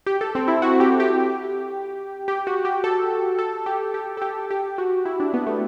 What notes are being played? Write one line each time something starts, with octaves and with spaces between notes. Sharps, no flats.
G4
A4
C4
E4
F#4
G4
G4
G4
F#4
G4
A4
A4
G4
G4
A4
G4
G4
F#4
E4
D4
B3
A3